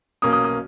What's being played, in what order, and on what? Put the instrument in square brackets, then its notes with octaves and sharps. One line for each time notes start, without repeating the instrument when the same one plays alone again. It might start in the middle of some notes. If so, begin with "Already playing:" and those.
[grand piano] B1 B2 A#3 C#4 D#6
D#6
D#6